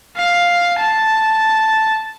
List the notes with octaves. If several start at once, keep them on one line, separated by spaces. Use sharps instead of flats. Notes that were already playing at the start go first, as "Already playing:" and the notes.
F5
A5